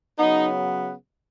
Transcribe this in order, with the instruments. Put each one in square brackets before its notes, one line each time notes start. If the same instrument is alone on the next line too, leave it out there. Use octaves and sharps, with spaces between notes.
[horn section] C#3 F#3 B3 D#4